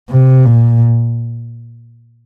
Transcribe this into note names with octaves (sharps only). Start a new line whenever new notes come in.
C3
A#2